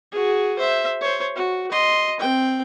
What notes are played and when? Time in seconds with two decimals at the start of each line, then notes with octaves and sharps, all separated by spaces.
0.12 F#4 G#4
0.58 C5 E5
1.01 C5 C#5
1.36 F#4
1.71 D#5 C6
2.20 C4 G5